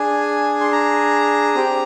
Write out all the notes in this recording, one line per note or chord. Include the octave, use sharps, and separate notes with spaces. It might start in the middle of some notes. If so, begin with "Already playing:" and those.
Already playing: D4 G#4 G#5
C6
A#5
C4 G4